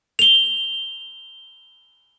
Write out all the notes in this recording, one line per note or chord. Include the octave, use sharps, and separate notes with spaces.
F7 G7